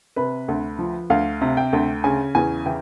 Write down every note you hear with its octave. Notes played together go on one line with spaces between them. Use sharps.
C3 B4
D2
F3
D2 F5
C3
G5
D2
C#3 G#5
E2 G#5
E3 G5